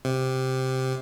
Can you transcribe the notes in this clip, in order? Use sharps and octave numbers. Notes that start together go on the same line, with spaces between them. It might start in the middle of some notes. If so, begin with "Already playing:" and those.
C3